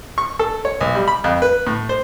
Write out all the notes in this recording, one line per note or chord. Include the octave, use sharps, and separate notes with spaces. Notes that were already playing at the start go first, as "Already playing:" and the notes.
C#6
A4
C#5
B1
G3
B5
F2
B4
A2
C5